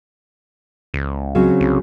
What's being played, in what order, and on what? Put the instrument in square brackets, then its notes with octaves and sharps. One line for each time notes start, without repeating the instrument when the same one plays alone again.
[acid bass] C#2
[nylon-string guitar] C#3 F#3 C4
[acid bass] C2